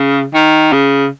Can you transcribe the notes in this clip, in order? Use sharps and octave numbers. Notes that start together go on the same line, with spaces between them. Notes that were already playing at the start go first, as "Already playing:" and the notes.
Already playing: C#3
D#3
C#3